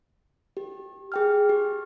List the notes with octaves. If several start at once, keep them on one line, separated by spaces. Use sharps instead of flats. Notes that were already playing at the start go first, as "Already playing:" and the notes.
G4
G#4 G5 F6
G4